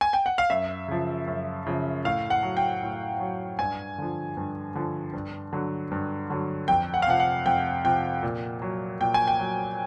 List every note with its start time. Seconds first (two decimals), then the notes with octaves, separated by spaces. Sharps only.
0.01 G#5
0.13 G5
0.26 F#5
0.38 F5
0.50 F#2 E5
0.88 C#3 F3
1.27 F#2
1.67 C#3 F3
2.04 A2 F5
2.30 F#5
2.43 F#3
2.57 G5
2.82 A2
3.20 F#3
3.59 G2 G#5
3.98 D3 F3
4.37 G2
4.75 D3 F3
5.13 G2
5.53 D3 F#3
5.92 G2
6.30 D3 F#3
6.68 F2 G5
6.94 F#5
7.02 F5
7.07 C3 F3 F#5
7.20 F#5
7.46 F2 G5
7.84 C3 F3 G5
8.23 A#2
8.62 F#3
9.01 A#2 G5
9.14 G#5
9.27 G5
9.39 F#3